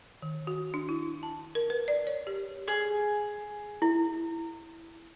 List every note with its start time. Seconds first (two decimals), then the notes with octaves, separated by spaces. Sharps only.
0.22 D#3
0.47 F#4
0.74 D4
0.89 E4
1.23 A5
1.55 A#4
1.70 B4
1.88 D5
2.07 C#5
2.27 G4
2.68 G#4
3.82 E4